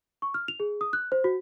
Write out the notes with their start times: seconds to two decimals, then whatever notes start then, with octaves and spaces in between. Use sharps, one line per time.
0.22 C#6
0.34 F6
0.48 F7
0.60 G#4
0.81 D#6
0.93 F#6
1.12 C5
1.24 F#4